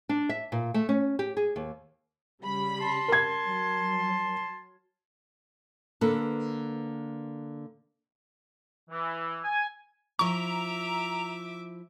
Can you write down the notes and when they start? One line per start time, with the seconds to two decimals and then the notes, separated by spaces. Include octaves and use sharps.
0.09 D4
0.29 E5
0.52 A#2
0.74 A3
0.89 C#4
1.19 G4
1.37 G#4
1.56 D#2
2.42 C#3 G3 B5
2.80 A5 C6
3.08 A#4 G#6
3.45 F#3
6.01 D3 A#3 A4 B4
8.90 E3
9.43 G#5
10.19 F3 E4 E5 A#5 C#6 D6